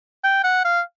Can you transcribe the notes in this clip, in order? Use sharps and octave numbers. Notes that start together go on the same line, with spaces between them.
G5
F#5
F5